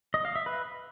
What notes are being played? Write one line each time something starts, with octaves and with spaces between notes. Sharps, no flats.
D#5
F5
E5
B4